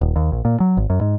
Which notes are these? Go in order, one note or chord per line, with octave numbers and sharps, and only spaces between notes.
D#1
D#2
A#1
A#2
F#3
G#1
F#2
G#2